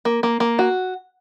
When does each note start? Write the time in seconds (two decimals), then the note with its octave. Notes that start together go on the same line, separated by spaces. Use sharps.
0.05 A#3
0.23 A#3
0.40 A#3
0.59 F#4